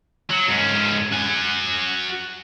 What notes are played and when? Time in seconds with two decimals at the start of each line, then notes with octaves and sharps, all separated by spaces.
0.30 F#3
0.49 G#2 C#4
1.12 F#4 G#5